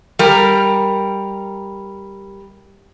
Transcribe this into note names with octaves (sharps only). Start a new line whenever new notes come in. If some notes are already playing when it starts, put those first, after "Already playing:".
G3 A#4